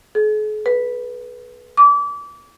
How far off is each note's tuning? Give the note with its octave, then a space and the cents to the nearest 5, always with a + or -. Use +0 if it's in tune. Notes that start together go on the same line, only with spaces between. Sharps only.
G#4 +45
B4 -10
D6 -30